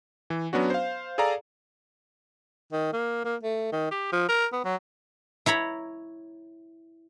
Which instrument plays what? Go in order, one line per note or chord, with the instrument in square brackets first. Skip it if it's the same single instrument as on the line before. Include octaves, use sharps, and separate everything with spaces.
[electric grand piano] E3
F#3 B3 C#4 D4 F#4
C5 F5
G#4 A4 D5 F5 A#5
[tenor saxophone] D#3
A#3
A#3
A3
D#3
G4
F3
A#4
B3
F#3
[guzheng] E4 C#5 A#5 B5